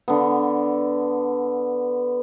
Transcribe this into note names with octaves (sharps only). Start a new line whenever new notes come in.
D3 B3